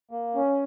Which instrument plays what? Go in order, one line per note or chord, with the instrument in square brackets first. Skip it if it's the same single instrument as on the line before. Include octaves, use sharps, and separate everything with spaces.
[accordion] A#3
C#4